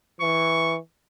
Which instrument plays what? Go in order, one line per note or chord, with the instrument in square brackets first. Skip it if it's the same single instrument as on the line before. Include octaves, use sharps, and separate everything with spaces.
[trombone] E3 [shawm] C#6